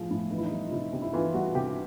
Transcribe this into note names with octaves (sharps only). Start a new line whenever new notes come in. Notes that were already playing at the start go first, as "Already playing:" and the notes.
Already playing: A2 F3 G#4
A2 E4
E3 D#4
E4
D#4
G3
F4
C3 E4
C3
E4
E3 F4
G3 F#4
C3 G4